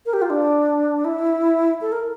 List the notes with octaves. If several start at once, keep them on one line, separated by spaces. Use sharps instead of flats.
A#4
G4
F4
D4
E4
A4
A#4